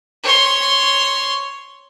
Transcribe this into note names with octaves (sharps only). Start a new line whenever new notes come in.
C#5 C6